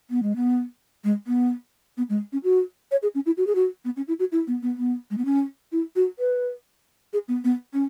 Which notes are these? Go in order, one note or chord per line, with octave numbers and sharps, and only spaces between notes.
B3
G#3
B3
G#3
B3
B3
G#3
C#4
F#4
C#5
G#4
C#4
E4
F#4
G#4
F#4
B3
C#4
E4
F#4
E4
B3
B3
B3
G#3
B3
C#4
E4
F#4
B4
G#4
B3
B3
C#4